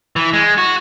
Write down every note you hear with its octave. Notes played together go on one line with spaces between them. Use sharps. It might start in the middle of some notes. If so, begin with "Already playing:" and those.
E3
G#3
F#4